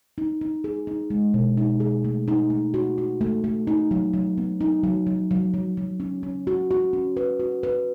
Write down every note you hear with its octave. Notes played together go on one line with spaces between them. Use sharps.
D#4
D#4
G#4
D#4
G#3
B2
D#4
G#4
A3
D#4
A3
F#4
F#4
A3
A3
D#4
F#3
F#3
B3
D#4
F#3
F#3
F#3
F#3
F#3
C#4
C#4
F#4
F#4
C#4
B4
F#4
B4